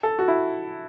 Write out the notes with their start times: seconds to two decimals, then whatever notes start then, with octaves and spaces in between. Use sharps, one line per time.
0.03 A4
0.19 F#4
0.28 E4